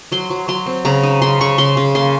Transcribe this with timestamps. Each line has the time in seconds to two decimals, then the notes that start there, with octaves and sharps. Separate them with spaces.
0.12 F#3 C6
0.30 F#3
0.48 F#3 C6
0.66 C4
0.85 C#3 A#5
1.03 D#4
1.22 C#3 C6
1.41 C#3 C#6
1.58 C#3 C6
1.77 C#3
1.95 A#3 C6